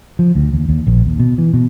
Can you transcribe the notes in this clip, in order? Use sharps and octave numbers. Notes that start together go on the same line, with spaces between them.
F3
D2
D#2
D#2
A#1
D#2
B2
E3
B2